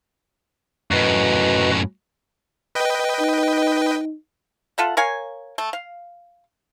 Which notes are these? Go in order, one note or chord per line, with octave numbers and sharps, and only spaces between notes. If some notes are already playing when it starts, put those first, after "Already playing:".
F#2 A2 F#4 B4 D#5
B4 D#5 G5
D#4
F4 A4 E5 F#5
A#4 C#5 F5 G#5
A3
F5